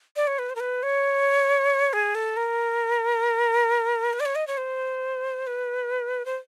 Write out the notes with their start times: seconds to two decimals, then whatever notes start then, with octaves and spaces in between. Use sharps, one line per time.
0.16 D5
0.27 C#5
0.39 B4
0.50 C5
0.55 A#4
0.60 B4
0.83 C#5
1.93 G#4
2.15 A4
2.37 A#4
4.13 B4
4.20 D5
4.25 C#5
4.35 D#5
4.47 C#5
4.57 C5
5.47 B4
6.25 C5